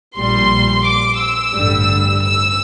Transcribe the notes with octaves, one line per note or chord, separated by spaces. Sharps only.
A#1 A#2 G3 C6
D6
E6
A1 G2 D3 G3
E6